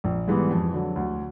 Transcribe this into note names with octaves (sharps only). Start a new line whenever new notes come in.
A#1
G#2 E3 G3 B3
F2
D3 F#3
D2